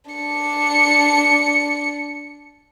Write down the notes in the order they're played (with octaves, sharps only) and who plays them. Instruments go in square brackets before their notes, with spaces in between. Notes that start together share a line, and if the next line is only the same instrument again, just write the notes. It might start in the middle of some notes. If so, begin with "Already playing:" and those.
[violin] D4 C#7